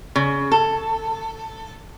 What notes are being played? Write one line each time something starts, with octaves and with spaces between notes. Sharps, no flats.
C#3
A4